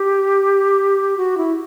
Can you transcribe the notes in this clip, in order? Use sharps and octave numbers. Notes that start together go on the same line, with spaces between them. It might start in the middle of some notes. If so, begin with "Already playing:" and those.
Already playing: G4
F#4
E4